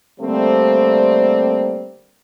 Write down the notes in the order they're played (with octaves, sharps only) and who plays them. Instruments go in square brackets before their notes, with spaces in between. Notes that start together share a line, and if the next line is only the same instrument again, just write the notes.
[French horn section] D3 G3 A3 A#3 C4